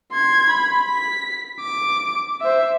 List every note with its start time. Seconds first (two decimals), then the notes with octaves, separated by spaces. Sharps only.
0.12 C6 G#6
0.50 B5
0.86 B6
1.61 D6
2.41 C5 E5